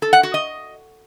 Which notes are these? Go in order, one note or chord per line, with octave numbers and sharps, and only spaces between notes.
A4
F#5
F#4
D#5